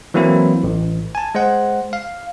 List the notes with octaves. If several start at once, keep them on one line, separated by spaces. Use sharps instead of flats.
E3 F#3 A#3 C4 E4
A1
G#5 A5
G#3 C5 F#5
F5